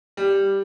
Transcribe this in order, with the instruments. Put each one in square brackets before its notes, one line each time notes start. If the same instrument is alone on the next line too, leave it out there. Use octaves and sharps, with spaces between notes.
[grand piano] G3